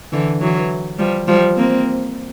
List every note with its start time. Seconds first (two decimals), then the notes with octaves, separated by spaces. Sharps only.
0.12 D3 E3
0.41 E3 F#3
0.99 F3 G3
1.28 F3 G3
1.57 A#3 C4